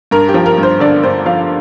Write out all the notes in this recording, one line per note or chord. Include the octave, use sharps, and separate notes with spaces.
G2 A#4
G4
F3
A#4
G2
C5
D3 D5
G2 C5
F3 F5